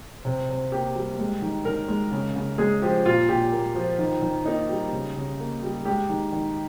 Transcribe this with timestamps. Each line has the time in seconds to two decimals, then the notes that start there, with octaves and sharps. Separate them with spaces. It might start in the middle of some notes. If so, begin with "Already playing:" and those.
0.25 C3
0.49 C3
0.72 A#3 G4
0.95 G3
1.19 G#3
1.42 D#3
1.65 D#3 A#4
1.88 G#3
2.11 C#3
2.36 C#3
2.58 G#3 G#4
2.82 F3 G4
3.06 A#2 F4
3.29 A#2 G4
3.52 A#3
3.75 F3
3.98 D#3
4.22 D#3
4.46 A#3 D#4
4.69 G3
4.92 C#3
5.16 C#3
5.39 A#3
5.62 G3
5.85 G#3 G4
6.09 D#3
6.32 D#3